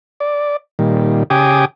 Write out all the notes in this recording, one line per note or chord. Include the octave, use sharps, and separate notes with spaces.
D5
A#2 D#3 G3
C#3 G4 G5 G#5 D6 D#6